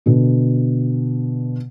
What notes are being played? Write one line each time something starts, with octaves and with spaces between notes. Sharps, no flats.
B2 D3